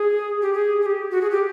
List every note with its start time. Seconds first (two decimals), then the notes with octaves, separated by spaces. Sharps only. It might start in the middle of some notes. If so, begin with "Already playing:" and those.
Already playing: G#4
0.42 G4
0.53 G#4
0.82 G#4
0.86 G4
1.11 F#4
1.22 G#4
1.31 G4